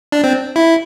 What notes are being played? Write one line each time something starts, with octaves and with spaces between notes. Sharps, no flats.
D4
C4
E4